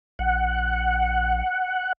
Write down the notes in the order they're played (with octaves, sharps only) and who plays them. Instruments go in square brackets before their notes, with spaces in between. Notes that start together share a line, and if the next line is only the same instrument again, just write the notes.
[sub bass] A#1 [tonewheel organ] F#5